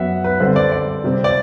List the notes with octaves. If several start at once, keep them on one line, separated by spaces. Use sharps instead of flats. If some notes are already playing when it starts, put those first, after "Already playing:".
Already playing: F#2 F#3 B3 E5 F#5
B4
G2 D3 G3 C4 C5
D5
D5
C3 G3 C4
D5